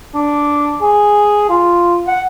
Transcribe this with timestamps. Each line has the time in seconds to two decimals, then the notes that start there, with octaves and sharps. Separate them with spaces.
0.14 D4
0.82 G#4
1.49 F4
2.07 F#5